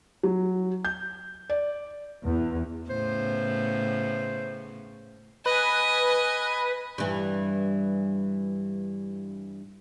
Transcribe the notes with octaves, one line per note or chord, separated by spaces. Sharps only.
F#3
G6
D5
E2
A2 C#3 B3 C5
B4 D#5 G#5
G2 E3